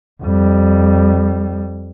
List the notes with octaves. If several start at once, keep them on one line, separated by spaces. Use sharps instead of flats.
F2 G3